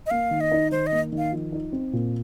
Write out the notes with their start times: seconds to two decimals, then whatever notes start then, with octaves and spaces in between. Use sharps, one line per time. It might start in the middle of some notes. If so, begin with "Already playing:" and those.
0.06 D#5
0.11 A#3 F5
0.31 D#3
0.41 D#5
0.52 D#4
0.71 D#3 C5
0.87 D#5
0.92 A#3
1.12 D#3
1.18 F5
1.32 F3
1.52 D#4
1.72 C4
1.93 A#2